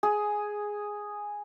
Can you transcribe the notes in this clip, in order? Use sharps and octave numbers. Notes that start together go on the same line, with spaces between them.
G#4